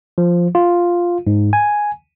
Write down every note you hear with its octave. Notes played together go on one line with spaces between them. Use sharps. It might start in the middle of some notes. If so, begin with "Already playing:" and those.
F3
F4
G#2
G#5